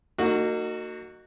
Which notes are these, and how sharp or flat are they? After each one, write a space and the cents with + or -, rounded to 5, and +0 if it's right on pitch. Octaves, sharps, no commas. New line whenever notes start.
A#3 -40 D#4 -20 F#4 +0